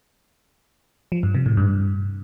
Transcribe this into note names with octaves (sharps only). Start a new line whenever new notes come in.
F3
G2
C3
A2
G2